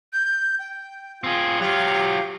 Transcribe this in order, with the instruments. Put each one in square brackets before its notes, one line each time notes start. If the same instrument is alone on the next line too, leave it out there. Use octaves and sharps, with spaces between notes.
[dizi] G6
G5
[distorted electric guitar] C4 G#4 [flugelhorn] F4
[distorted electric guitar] F#3 F4 [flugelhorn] G4 [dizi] F5